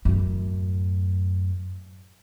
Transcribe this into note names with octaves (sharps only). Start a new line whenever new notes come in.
F#2 A2